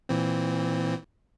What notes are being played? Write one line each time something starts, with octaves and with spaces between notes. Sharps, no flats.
A#2 E3 C4